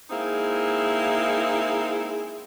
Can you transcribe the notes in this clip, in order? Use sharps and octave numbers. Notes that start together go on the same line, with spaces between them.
G#3 A#3 C4 D#4 E4 G#4